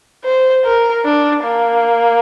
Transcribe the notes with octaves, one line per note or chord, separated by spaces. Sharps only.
C5
A#4
D4
A#3